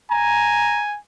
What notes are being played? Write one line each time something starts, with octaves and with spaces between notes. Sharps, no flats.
G#5 A#5